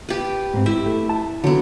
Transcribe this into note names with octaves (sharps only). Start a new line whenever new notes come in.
G4 B4
G#2 C4
E4 G4 E5
A3
A5
D3 F#3 B3